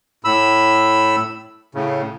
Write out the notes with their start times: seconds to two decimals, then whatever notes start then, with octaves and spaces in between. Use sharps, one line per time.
0.24 A2 B5 E6
1.75 A2 C#3